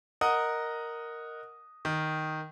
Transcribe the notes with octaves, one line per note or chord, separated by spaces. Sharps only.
A#4 D#5 F#5 D#6
D#3